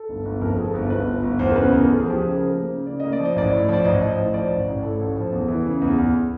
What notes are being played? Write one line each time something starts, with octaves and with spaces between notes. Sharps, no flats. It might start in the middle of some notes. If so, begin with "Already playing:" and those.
Already playing: A4
G1
G1
F2 A#4
A4
G1 G#4
A4
G1
G1 B4
G1
G1
E2 C5
A#4
C#3 B4
E2 A#4
E2 A4
G#4
F3
G4
C#3 G#4
F3 A#4
A#3
C#3
C#3 D5
A#3 D#5
D5
F3
D#5
A1 D5
A2
F3 D5
A1 D#5
F3
A2
F3 D5
A1
A1
A2 A4
A1
F3
E2
E3
C#3
E2
E2